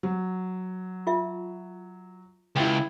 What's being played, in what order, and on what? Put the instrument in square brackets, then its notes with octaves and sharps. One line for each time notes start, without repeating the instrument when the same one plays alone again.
[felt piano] F#3
[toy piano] F4 E5
[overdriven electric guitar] C#2 [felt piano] E4 G5